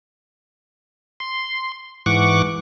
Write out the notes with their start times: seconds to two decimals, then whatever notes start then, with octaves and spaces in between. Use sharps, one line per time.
1.20 C6
2.06 G#2 E3 F#5 C#6 D6